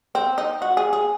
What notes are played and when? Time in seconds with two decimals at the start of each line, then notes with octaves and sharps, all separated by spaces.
0.15 C4
0.38 D#4
0.62 F#4
0.77 G#4
0.93 G#4